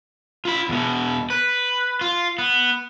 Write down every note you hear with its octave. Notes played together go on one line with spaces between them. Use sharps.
F4 B5
E2 B2
B4
F4
B3